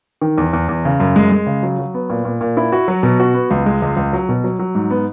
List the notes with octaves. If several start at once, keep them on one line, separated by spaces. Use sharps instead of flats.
D#3
E2
E2
E2
C#3
F#2
G#3
G#3
C#3
F#3
F#3
B3
A#2
A#2
A#2
E4
F#4
F#3
B2
F#4
B3
C#2
G#3
C#2
C#2
F#3
B2
F#3
F#3
G#2
B3